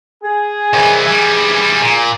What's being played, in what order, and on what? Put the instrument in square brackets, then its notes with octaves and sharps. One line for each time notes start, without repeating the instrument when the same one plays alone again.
[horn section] G#4
[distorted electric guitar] C2 E3
E3 G3
A#2